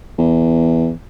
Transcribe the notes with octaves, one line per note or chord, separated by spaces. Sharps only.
E2